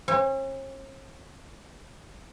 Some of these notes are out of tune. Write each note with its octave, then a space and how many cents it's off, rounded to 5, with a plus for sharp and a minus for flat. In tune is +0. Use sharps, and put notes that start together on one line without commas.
C#4 -45